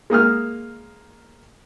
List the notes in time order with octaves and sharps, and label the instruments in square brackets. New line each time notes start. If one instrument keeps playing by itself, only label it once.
[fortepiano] G#3 A#3 D#6 F6